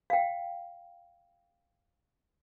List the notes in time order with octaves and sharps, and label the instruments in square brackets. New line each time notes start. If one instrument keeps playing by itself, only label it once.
[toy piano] F5 G5